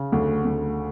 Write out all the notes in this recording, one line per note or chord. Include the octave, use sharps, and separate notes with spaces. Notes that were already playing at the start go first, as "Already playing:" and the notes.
Already playing: C#3
D2
D2